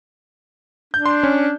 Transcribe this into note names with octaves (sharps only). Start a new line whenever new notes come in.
D4 G6
C6
C#4